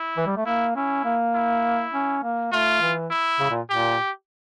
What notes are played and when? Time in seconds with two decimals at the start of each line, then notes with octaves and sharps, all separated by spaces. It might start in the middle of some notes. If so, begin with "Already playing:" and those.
Already playing: E4
0.17 E3
0.27 G3
0.37 A3
0.46 A#3 E4
0.76 C#4 E4
1.05 A#3
1.35 E4
1.93 C#4
2.23 A#3
2.53 A3 F4
2.81 E3
3.11 E4
3.40 C#3
3.50 A#2
3.70 A#2 G4